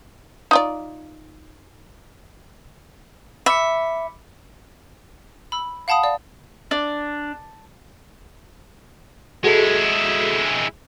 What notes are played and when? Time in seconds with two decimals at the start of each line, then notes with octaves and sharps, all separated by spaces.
0.51 D#4 F4 D5
3.46 E5 B5 D6 C#7
5.52 B5 E6
5.88 F5 F#5 A5 B5 D#6
6.04 D5 F5
6.71 D4
9.44 G#3 E4 F#4 G#4 A4